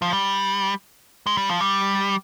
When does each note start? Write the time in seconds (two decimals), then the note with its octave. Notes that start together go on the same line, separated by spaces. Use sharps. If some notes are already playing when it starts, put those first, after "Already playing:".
0.02 F3
0.13 G3
1.27 G#3
1.37 G3
1.49 F3
1.61 G3